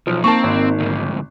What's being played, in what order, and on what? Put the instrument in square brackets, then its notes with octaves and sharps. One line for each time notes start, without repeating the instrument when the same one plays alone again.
[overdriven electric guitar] B1 [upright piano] F3
[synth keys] A#3 D#4 A#4 [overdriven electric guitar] C4 [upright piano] A5 C#6
[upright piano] G#1
[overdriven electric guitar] D2 G#2